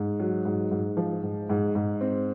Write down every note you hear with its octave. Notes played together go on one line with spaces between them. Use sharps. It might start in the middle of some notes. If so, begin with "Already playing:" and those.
Already playing: G#2
F#3
G#2
G#2
F3
G#2
G#2
G#2
C4